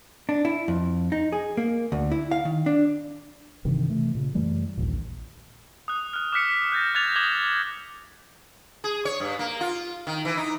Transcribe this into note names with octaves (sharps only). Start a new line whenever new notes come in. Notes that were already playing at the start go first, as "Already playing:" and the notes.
D4
E4
F2
D#4
G#4
A#3
D2
E4
F5
D#3
D4
G2 C3 D#3 E3
C3 E3 A3
A#2 C#3
F#2 E3 G3 A3
A#1 D#2 A#2
D#6 F#6
F6 F#6
D6 F6 F#6 B6 C#7
F#6 G6 A6 A#6
D6 F#6 G#6 A6 B6 F7
D6 D#6 F#6 G#6 F#7 G7
G#4
C#5
G2
A#3
F4
D#3
E3
D#4